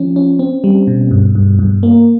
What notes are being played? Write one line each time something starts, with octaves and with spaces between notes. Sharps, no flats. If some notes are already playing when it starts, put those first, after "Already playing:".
Already playing: F3 C#4
C#4
C4
G3
B2
G2
G2
G2
A#3